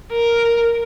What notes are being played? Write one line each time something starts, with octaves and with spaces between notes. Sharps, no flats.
A#4